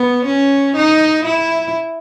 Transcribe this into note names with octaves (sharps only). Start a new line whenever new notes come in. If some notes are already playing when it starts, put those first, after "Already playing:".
Already playing: B3
C#4
D#4
E4